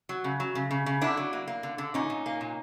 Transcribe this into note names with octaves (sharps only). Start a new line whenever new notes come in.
F#3
C#3
F#3
C#3
C#3
C#3
D3 D4 E4
F#3
A#3
A#3
D3
D3
A#2 C#4 D#4
A#2
A#3
A#2